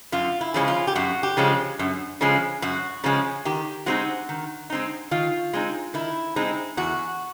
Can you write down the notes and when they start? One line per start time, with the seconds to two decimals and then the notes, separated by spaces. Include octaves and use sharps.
0.12 F#2 F4
0.41 E4
0.54 C#3 F3 G#3 C#4
0.68 F4
0.87 G4
0.95 F#2 F#4
1.23 G4
1.37 C#3 F3 G#3 C#4
1.79 F#2
2.21 C#3 F3 G#3 C#4
2.62 F#2 F#4
3.04 C#3 F3 G#3 C#4
3.45 D#3 G4
3.86 G#3 C4 D#4 F#4
4.29 D#3
4.70 G#3 C4 D#4
5.11 D#3 F4
5.53 G#3 C4 D#4
5.94 D#3 E4
6.36 G#3 C4 D#4
6.77 E2 F#4